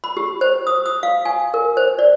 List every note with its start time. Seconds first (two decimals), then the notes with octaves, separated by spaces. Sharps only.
0.04 B5
0.17 G4
0.41 C5
0.67 D#6
0.86 D#6
1.03 F5
1.25 G#5
1.54 A#4
1.77 C5
1.99 D5